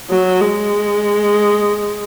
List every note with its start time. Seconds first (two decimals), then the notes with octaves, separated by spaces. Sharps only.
0.10 F#3
0.41 G#3